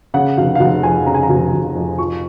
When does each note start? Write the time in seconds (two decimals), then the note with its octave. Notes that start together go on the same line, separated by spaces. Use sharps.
0.14 C#3 F#5
0.37 F1 F5
0.55 F5
0.60 F1 F#5
0.83 F2 G#5
1.06 C#3 A#5
1.15 G#5
1.23 A#5
1.30 F1
1.53 F1
1.75 F2
1.98 F3 C#6